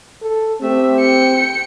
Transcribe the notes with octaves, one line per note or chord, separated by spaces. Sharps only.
A4
A3 C4 G4 E5
G5 C#7